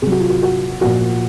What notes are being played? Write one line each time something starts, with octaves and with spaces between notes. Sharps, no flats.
C3 F#3 G#4
F#4
F4
F#4
F#4
A#2 F3 F#4